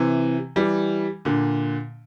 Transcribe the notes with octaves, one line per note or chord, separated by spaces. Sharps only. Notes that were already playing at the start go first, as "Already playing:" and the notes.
Already playing: C3 E3
E3 G3
A#2 D3